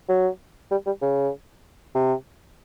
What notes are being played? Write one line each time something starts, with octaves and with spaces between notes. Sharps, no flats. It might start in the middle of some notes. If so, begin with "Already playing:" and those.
F#3
G3
G3
C#3
C3